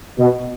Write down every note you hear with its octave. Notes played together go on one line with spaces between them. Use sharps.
B2